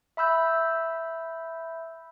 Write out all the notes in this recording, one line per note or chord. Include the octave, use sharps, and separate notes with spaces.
E5 B5 E6 G6